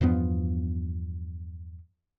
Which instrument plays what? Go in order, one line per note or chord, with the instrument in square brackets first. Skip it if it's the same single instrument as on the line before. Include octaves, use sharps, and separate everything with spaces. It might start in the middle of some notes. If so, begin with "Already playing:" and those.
[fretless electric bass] E2 G2 F3 B3